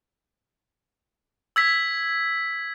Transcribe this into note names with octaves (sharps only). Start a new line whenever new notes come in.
E6 G#6 B6